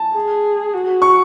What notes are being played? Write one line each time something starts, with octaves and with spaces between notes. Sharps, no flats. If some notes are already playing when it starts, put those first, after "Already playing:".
Already playing: A5
G#4
F#4
C#6